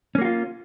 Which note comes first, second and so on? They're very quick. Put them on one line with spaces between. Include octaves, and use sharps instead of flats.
C#4 A#3 F#4 F4